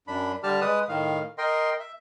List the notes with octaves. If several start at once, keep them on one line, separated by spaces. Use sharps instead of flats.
F#2 D4 B5
D3 G3 G4 A5 F6
G#3 B4 D#6
A2 D#3 F5
A#4 D#5 G5 C6
E5